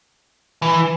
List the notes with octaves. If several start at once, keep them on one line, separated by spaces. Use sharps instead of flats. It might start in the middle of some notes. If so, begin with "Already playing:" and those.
E3